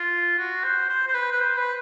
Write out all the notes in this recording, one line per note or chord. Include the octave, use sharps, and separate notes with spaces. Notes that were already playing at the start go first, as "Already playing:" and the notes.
Already playing: F4
F#4
C5
C5
C5
B4
B4
C5
B4